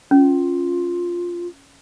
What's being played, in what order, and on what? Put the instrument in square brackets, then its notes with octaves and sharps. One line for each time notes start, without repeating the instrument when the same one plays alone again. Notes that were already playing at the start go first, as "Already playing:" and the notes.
[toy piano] C#4 [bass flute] F4